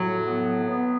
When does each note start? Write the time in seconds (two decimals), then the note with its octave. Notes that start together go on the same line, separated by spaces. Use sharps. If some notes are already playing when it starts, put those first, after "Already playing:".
Already playing: A2 F#3
0.27 B3
0.68 B3